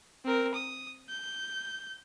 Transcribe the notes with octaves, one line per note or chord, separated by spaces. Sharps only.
C4 A#4
D#6
G6